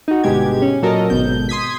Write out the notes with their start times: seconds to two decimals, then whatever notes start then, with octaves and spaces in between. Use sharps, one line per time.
0.08 D#4 F#4
0.24 G1 B2 G#3 G4 G#6
0.62 C#4
0.82 A#2 F#3 A4 A#4 D#5
1.10 G#1 B2 G6
1.49 C6 D#6 G#6 B6